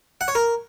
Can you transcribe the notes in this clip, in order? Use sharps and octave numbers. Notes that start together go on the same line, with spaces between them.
F#5
C#5
A#4